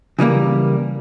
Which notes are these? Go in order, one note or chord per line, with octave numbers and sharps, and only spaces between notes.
C#3 E3 G3 A#3